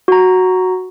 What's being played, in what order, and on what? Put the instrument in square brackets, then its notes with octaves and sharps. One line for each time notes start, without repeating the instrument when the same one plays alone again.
[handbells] F#4 A#5